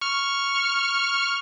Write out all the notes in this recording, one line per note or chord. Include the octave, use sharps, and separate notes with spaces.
C#6 F6